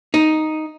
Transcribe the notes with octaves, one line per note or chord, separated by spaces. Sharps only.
D#4